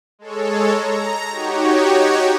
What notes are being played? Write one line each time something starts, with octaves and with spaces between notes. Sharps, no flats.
G#3 A4 C#5
A#5
D#4 F#4 G4 C#5